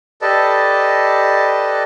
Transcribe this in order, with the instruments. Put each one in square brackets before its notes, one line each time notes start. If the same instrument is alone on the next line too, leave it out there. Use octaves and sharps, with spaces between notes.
[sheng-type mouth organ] G4 A4 B4 D5 D#5 A5